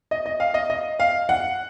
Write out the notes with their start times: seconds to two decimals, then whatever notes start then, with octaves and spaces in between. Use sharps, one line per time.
0.11 D#5
0.26 D#5
0.40 F5
0.54 D#5
0.70 D#5
1.00 F5
1.29 F#5